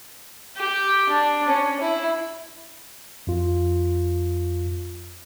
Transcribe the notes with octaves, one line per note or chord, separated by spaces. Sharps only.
G4
D4
C#4
E4
F2 F4